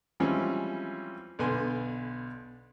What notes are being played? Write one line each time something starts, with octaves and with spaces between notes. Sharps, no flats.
E3 F3 G3 G#3 C4 C#4
B1 D3 B3 D4 G#5 C6